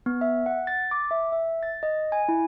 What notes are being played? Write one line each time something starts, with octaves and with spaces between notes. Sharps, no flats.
B3
E5
F#5
A6
D6
E5
E5
A6
D#5
G#5
E4